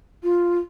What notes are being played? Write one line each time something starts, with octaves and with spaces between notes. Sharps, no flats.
F4